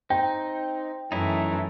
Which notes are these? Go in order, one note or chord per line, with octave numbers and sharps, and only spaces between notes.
C4 D#4 G5
F#2 E3 A3 C#4 D#4 E4